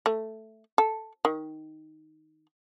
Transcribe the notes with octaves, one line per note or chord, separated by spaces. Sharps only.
A3
A4
D#3